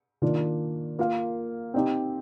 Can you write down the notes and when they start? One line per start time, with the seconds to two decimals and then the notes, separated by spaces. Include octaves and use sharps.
0.22 D#3 A#3 D4 F4
0.99 A#3 F4 A#4 F5
1.74 C4 D#4 G4